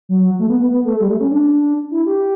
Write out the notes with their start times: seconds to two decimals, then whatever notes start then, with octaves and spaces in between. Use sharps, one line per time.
0.09 F#3
0.39 A3
0.49 B3
0.59 B3
0.70 B3
0.85 A3
1.00 G3
1.10 A3
1.20 C#4
1.31 D4
1.91 E4
2.06 G4